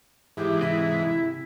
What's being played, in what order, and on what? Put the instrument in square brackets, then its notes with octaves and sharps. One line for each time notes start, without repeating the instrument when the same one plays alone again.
[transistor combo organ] G#2 E3 [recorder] G4
[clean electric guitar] C3 [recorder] E4